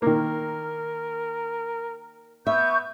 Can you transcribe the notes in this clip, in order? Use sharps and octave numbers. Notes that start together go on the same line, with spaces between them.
D#3 A#3 A#4
B3 E5 C#6 G6